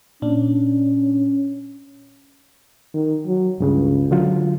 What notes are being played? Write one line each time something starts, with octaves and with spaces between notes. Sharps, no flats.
A#2 C#4 D4
D#3
F#3
C#2 G2 C#3
D3 F#3 F4